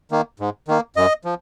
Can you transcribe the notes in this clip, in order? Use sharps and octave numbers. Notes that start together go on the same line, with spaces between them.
D#3 A#3
G#2
D#3 A#3
F#2 D#5
F3